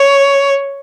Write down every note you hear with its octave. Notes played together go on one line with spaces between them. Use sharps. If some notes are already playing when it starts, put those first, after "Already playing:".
Already playing: C#5